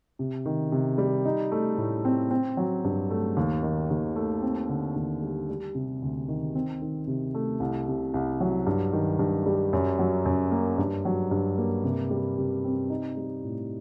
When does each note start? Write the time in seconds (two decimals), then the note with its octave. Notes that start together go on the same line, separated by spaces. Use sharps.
0.19 C3
0.46 D#3
0.72 C3
0.98 G3
1.25 D#4
1.52 A3
1.77 A2
2.05 C4
2.31 C4
2.57 F#3
2.84 G2
3.10 A3
3.37 D#2
3.63 D#3
3.90 D#2
4.16 A3
4.42 C4
4.69 D3
4.96 D#2
5.22 G3
5.49 G3
5.75 C3
6.02 D2
6.28 D#3
6.55 C4
6.82 D#3
7.07 C3
7.34 A3
7.60 C2
7.88 C3
8.14 C2
8.40 F#3
8.66 G2
8.93 D#3
9.19 G2
9.46 G3
9.73 F#2
9.99 F#3
10.26 F#2
10.51 A#3
10.78 G2
11.05 F#3
11.31 G2
11.58 A#3
11.84 C3
12.11 G3
12.38 C3
12.64 C4
12.90 D#4
13.17 G3
13.44 A2